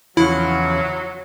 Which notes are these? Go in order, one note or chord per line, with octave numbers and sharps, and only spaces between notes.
E2 C#3 F3 F#3 E4